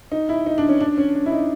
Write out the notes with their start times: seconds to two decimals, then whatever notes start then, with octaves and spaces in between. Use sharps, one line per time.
0.12 D#4
0.29 E4
0.46 D#4
0.58 D4
0.69 C#4
0.80 D4
0.97 C#4
1.15 D4
1.26 E4
1.31 D#4